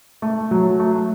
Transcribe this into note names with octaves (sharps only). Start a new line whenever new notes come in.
A3
F#3
A3